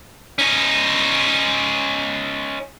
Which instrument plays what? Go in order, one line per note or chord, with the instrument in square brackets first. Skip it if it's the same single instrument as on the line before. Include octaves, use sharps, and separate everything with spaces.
[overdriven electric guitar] C#4 D#4